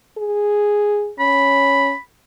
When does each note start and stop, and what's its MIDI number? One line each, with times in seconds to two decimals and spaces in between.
0.18 1.12 68
1.19 1.92 61
1.19 1.99 83